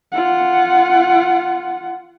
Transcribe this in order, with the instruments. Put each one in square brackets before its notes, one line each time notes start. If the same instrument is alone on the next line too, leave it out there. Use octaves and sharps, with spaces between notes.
[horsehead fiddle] F4 F#5